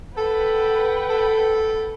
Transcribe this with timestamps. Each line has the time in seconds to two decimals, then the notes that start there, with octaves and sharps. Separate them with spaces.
0.17 A4 B4 F#5 G5
1.10 A4